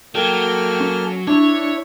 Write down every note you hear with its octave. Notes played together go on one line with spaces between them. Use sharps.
F#3 A#3 A4 G5 F6
C#4
D4 E4 C#5